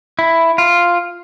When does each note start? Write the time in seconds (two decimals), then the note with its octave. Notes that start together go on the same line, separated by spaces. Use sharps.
0.19 E4
0.58 F4